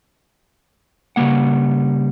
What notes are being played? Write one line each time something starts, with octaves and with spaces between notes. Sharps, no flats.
C#3 G3 A3 A#3 F#5